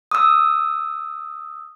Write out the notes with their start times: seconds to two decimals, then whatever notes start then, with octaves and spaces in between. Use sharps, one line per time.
0.11 D#6 E6